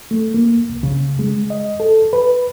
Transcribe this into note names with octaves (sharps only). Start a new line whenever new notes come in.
A3
A#3
C2
C#3
G#3
D#5
A4
B4